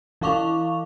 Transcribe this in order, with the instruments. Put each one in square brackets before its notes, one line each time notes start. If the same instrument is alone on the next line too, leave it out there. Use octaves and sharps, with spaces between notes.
[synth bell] E3 E4 F5 C#6 D6 F7